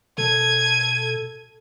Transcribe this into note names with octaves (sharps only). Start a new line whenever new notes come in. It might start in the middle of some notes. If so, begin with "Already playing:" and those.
B2 A4 G#6 D#7